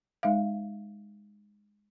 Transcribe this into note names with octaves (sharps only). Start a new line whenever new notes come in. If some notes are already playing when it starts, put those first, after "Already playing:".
G#3 D#4 E5 F5